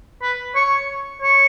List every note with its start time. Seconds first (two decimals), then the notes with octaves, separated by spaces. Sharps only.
0.22 B4
0.55 C#5
1.22 C#5